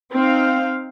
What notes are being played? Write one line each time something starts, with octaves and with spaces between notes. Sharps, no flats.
C4 D#4 F5